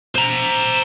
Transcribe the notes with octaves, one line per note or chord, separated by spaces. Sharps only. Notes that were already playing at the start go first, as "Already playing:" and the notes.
C5 A#5